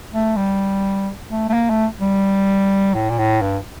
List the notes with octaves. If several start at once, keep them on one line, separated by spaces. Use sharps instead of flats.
A3
G3
A3
A3
A#3
A3
G3
A2
A#2
A2
G2